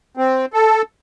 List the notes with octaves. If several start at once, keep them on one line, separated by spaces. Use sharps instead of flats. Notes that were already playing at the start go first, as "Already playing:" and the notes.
C4
A4